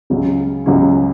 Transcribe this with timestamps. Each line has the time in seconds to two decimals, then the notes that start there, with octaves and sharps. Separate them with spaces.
0.10 C#2 C#3 F#3 C#4
0.66 C#2 C#3 F#3 C#4